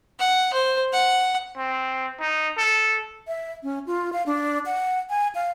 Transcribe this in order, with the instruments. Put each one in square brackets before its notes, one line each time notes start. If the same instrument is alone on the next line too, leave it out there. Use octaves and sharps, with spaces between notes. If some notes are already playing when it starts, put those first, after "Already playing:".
[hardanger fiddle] F#5
C5
F#5
[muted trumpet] C4
D#4
A4
[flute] E5
C#4
F4
F5
D4
F#5
G#5
F5